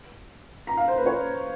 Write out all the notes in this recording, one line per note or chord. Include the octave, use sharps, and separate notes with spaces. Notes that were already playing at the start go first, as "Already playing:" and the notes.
A#5
F5
C5
B4
C#5